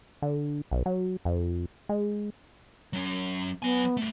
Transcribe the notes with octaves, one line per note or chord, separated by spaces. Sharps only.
D3
B1
F#3
F2
G#3
F#3 C#4
F#3 B3 G#5
G2 A3